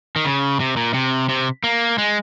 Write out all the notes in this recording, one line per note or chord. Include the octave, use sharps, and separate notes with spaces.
D#3
C#3
C3
A#2
C3
C3
A#3
G#3